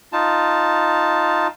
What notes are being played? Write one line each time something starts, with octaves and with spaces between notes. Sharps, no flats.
D#4 F4 A5